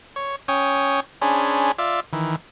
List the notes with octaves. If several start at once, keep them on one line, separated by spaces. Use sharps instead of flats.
C#5
C#4 C#5 G5 D#6
C#4 D4 G#4 C5 B5
F4 D5 E5
D#3 E3